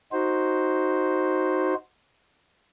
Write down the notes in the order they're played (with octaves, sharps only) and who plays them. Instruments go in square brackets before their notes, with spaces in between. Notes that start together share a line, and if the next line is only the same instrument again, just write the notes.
[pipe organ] D#4 F#4 C5